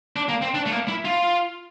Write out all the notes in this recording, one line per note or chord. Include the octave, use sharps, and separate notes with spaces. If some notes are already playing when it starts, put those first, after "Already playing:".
D4
A#3
C4
D4
A3
A#3
E4
F4